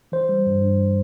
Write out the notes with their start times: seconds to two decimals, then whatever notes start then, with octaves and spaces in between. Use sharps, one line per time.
0.12 E3 C5
0.29 G3
0.46 G2
0.62 G2